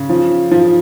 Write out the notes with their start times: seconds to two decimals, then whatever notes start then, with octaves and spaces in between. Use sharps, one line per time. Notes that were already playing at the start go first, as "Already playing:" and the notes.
Already playing: C#3
0.09 F3
0.51 F3